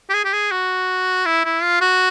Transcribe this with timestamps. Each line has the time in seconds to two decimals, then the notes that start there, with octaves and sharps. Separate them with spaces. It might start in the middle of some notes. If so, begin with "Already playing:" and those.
0.10 G4
0.14 G#4
0.25 G4
0.33 G#4
0.52 F#4
1.25 E4
1.45 E4
1.63 F4
1.81 F#4